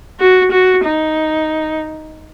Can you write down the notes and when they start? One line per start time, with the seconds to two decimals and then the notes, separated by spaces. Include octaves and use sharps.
0.20 F#4
0.52 F#4
0.85 D#4